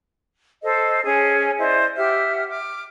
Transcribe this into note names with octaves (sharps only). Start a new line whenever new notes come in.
A4 C5 D#5
C#4 G#4 G#5
E4 C5 D5 D#5
G4 E5 F#5 F6
D6 F6